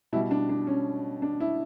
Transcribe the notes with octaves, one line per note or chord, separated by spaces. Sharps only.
B2 G3 E4
D4
D4
C#4
D4
E4